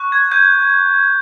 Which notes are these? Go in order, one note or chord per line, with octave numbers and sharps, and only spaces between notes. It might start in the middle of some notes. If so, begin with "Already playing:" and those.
Already playing: C#6 F#6
G#6
G6